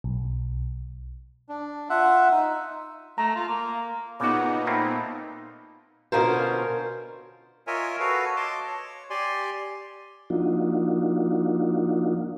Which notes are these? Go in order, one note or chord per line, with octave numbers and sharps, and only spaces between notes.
B1
D4
F4 E5 F#5
D#4
A3 A#5
F4
A#3
A#2 C#3 B3 D#4 F#4 D6
A3 A#3 C4 B5
B2 D3 C#4 F4 A#4 C5
F4 A#4 C#5 D#5 E5 G#5
F#4 A4 B4 C#5 F5
D#5 A5 C6 D6
C#5
G4 D5 G#5 C6
F3 A#3 D4 D#4 F4 F#4